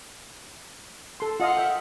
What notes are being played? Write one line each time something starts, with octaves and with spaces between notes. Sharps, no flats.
A4 C6
F4 D#5 F5 F#5
E5 G5